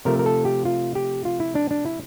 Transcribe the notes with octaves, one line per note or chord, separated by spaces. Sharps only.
C3 F3 A3 A#4
A#4
A4
G4
F4
G4
F4
E4
D4
D4
E4